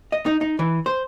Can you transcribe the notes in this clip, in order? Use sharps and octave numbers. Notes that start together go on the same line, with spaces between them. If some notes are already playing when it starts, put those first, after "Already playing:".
D#5
D#4
D#4
E3
C5